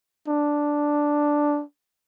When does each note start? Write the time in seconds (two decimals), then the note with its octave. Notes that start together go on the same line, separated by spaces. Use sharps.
0.28 D4